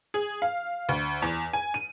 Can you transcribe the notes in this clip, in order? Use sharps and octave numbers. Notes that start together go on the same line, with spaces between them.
G#4
F5
D2
E2
G#5
D#7